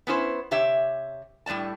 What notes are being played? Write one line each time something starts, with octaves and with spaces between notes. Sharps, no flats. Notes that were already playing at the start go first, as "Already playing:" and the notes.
B3 C#4 E4 C5
C3 G4 C#5 E5
A2 G3 B3 D5 A5